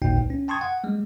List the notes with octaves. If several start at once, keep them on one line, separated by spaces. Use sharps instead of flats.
A1 D#2 A#2 D#4 F#4 G5
C#2
C#4
G5 A5 C6 C#6 D#6 G#6
F#5
G3 G#3